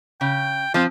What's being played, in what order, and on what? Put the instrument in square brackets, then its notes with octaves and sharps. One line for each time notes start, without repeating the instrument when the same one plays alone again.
[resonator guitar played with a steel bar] C#3 [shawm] G5
[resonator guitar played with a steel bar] F3 C4 [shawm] F4